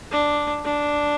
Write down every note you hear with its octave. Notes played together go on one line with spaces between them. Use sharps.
D4
D4